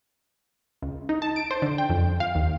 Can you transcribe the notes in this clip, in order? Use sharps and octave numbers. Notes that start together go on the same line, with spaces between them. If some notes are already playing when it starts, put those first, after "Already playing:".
C#2
D#4
A5
D7
C5
D3
G5
F2
F5
D#2